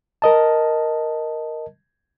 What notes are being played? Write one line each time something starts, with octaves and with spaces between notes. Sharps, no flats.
A#4 D#5 A5